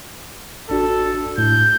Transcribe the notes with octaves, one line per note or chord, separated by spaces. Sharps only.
A1 D4 F#4 A4
A2 G6